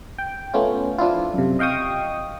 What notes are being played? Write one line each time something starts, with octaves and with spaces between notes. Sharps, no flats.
G5
A3 B3 C#4 F4
F3 D4 E4 F4
F#2 C3
D#5 F5 G5 C#6 D#6